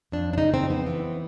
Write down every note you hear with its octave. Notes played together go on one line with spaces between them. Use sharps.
F2 D4
D4
C#3 D#4
C4
F2
B3
E3